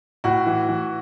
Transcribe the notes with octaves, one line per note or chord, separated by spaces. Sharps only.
A2 F#4
E3
E3